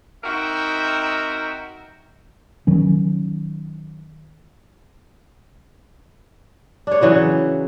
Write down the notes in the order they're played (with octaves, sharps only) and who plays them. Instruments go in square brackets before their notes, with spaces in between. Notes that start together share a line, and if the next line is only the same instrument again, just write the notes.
[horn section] C4 D#4 F#4 A#4 E5 G5
[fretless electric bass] D#3 F#3 C#4
[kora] D4 C#5
C#3 E3 F#3 B4